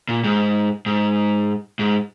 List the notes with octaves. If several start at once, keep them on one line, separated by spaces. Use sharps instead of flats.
A#2
G#2
G#2
G#2